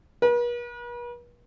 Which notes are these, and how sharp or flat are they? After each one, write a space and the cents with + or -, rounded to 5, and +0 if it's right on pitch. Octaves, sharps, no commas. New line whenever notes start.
B4 -45